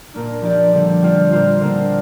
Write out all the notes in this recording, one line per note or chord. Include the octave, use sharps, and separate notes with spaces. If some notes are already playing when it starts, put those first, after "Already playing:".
A#2 A#3 D4
F3 D4 G4 D5
D3 G3 D4
G3 C4 F4 D5
A#2 A#3 F4 C5
D3 A#3 D4